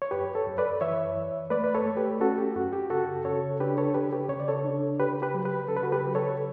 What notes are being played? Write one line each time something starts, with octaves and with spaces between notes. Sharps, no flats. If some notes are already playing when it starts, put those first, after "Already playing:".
C#5
F#2 G4 B4
A4 C#5
F#2
B4 D5
E3 C#5 E5
F#2
A3 B4 D5
B4
A4 C#5
A3
G4 B4
C#4 F#4 A4
G4
F#2 F#4
G4
C#3 F#4 A4
C#3 A4 C#5
D4 G4 B4
A4 C#5
C#3 G4 B4
G4
C#3 C#5
D5
A4 C#5
D4
C#3 G4 B4
G4 B4
F#3
G4 B4
C#3 A4
B4
F#4 A4
G4 B4
F#3
A4 C#5